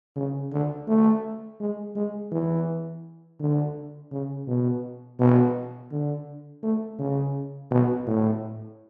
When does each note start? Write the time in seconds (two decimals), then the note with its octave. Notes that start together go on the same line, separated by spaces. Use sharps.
0.16 C#3
0.52 D3
0.88 A3
1.60 G#3
1.96 G#3
2.32 E3
3.40 D3
4.12 C#3
4.47 B2
5.20 B2
5.91 D3
6.63 A3
6.99 C#3
7.71 B2
8.07 A2